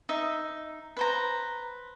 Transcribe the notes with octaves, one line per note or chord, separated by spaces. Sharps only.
D#4 E5
B4 C5 A#5